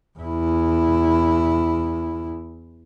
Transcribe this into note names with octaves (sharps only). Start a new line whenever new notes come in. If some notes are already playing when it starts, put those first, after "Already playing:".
E2 E4